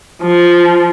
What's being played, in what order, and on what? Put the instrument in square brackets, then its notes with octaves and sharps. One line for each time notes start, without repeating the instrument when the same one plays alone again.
[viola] F3